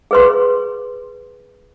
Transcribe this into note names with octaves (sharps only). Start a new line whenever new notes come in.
G#4 B4 C6